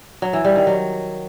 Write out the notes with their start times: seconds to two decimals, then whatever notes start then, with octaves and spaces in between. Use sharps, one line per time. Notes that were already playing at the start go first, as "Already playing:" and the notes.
0.22 F#3
0.33 E3
0.44 G3
0.56 D#3
0.67 F#3